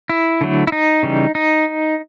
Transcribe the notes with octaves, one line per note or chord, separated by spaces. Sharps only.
E4
D3 F#3 A3
E4
D#4
C#3 E3 G3
D#4